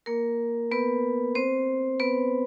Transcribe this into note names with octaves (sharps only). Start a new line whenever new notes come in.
A#3 A#4
B3 B4
C4 C5
B3 B4